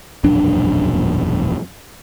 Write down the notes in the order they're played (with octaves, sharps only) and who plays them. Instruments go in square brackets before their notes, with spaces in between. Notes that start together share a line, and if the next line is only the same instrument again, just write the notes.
[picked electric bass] E1 A#1 F#2 D4